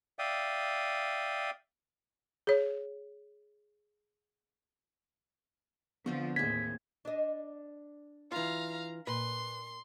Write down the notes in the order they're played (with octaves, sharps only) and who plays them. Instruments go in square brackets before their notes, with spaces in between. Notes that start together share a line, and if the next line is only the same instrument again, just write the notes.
[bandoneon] D5 E5 F5 G5 D#6
[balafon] G#4 C#5
[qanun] D3 C4 A4 [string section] F3 [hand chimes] B3
[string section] D#2 A2 [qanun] C4 G#4 [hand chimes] G#6 [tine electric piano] B6
[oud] D4 D#5
[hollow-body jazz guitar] E3 F4 [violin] F5 A#5
[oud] A#2 [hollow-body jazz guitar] B4 [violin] C6